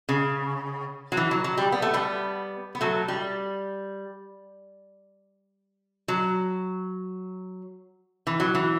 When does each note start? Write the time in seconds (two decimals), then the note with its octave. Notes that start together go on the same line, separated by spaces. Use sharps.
0.09 C#3
1.12 F#3
1.17 E3
1.31 F#3
1.44 F#3
1.57 G3
1.72 B3
1.82 A3
1.94 G3 B3
2.75 B3
2.81 F#3 A3
3.08 G3
6.08 F#3
8.27 E3
8.40 F#3
8.55 E3